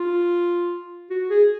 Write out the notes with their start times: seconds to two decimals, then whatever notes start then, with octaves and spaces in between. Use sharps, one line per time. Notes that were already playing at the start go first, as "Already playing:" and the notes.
Already playing: F4
1.10 F#4
1.30 G#4